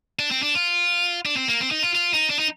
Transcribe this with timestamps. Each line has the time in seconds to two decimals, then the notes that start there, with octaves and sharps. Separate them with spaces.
0.19 D4
0.31 C4
0.43 D4
0.55 F4
1.26 D4
1.37 C4
1.48 A#3
1.61 C4
1.71 D#4
1.83 F4
1.95 F4
2.13 D#4
2.30 D4
2.39 D#4